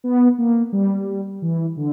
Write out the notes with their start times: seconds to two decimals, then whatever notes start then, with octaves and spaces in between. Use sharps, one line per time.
0.04 B3
0.38 A#3
0.72 G3
1.42 E3
1.77 D3